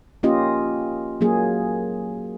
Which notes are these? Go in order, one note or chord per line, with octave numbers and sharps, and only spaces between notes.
A#3 C#4 F4 G4 D#5
F#3 A#3 G#4